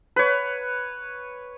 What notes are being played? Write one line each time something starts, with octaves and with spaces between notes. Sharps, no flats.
B4 C#5